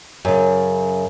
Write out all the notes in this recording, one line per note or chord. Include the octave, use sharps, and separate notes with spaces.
F#2 C#3